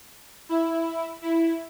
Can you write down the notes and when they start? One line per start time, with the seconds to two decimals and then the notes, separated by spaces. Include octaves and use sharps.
0.49 E4
1.22 E4